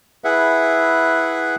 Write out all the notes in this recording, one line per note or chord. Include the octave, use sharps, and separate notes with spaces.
E4 G#4 B4 E5 F#5